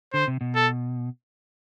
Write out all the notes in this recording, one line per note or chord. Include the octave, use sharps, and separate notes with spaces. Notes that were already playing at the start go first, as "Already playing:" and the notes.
D3 C5
C3
B2
A4